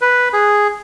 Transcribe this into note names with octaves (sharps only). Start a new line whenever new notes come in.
B4
G#4